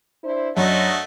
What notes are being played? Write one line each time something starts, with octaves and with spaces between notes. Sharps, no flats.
D4 E4 C5
F#2 F#3 A3 D4 F#4 C#5 D#5